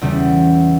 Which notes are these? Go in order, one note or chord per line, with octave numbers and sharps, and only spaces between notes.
E2 C#3 G3